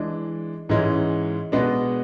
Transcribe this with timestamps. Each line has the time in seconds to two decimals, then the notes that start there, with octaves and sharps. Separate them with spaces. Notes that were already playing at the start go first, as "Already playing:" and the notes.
Already playing: E3 G#3 D4
0.69 G#2 E3 G#3 C#4
1.52 B2 G#3 B3 D4